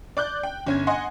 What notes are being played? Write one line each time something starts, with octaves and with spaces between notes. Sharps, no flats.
D5 D6 F#6 G6
G5
G1 C#4 G#6
D#5 F#5 G#5 C6